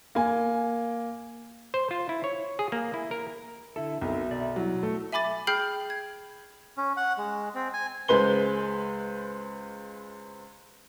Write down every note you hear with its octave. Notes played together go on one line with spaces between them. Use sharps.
A#3 G#5
C5
F4
E4
C#5
G#4
A#3
E4
A#4
D3 E4 A4 E5
B1 C4 D#4 A#4 E5
B2 D5
F#3 E4
A3
E5 G#5 B5 D6 A6
G#4 G5 B5 F6 G6 C7
G#6
C#4
F#5
G#3
C4
G#5
C#2 G#3 B4 C5 G7